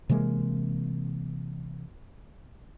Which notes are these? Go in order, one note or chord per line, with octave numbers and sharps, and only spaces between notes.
C3 E3 G#3 A#3